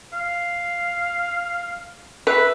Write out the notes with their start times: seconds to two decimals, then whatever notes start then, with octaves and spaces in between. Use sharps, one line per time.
0.13 F5
2.27 B4 E5